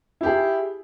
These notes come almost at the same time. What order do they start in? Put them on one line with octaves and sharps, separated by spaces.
E4 G4 G#4